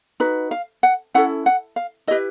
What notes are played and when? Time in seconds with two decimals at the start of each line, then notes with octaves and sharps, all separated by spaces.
0.20 D#4 F#4 B4
0.51 F5
0.83 F#5
1.14 C#4 E4 A4 F#5
1.46 F#5
1.76 F5
2.07 E4 D#5
2.11 G4 B4